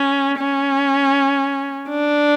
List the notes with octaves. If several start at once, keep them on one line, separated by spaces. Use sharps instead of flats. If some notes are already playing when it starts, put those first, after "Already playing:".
Already playing: C#4
C#4
D4